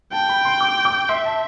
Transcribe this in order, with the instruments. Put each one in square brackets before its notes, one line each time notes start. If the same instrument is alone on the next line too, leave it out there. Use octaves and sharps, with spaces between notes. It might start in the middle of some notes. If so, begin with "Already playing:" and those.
[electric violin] G5 [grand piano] A5
[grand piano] B5
C6
D6
D6
[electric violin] E5 [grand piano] C6
[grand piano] A5